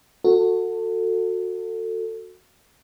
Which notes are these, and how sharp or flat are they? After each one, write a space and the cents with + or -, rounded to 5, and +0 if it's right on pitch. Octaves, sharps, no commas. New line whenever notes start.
F#4 -15 A4 +25